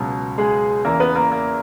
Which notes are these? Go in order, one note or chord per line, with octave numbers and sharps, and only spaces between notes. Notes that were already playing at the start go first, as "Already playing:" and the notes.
Already playing: C#2 B2 F#3
G#3 G#4
E2 C#3 E3 A#3 A#4
B3 B4
A#3 A#4
A#3 A#4